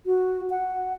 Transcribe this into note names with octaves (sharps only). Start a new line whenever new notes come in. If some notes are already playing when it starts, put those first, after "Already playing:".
F#4
F#5